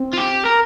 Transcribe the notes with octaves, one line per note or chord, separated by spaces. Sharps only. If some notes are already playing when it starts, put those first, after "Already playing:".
Already playing: C4
F4
G4
A#4